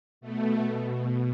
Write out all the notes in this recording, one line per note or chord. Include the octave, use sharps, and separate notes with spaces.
B2 A3